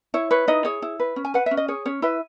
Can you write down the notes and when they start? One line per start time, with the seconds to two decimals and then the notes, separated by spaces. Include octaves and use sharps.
0.14 E4 C#5
0.31 B4 C#5
0.48 D#4 E4 D#5
0.65 G#4 C#5
0.82 E4
1.00 B4
1.16 C#4
1.25 G#5
1.34 B4 F#5
1.46 C#4 E5
1.57 D#5
1.68 G#4 C#5
1.86 C#4 C#5
2.02 E4 B4 E5